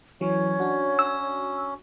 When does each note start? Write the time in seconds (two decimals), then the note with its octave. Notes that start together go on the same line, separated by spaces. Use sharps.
0.21 E3 F#3 C#4 C#5
0.60 D4 F#4
0.99 E6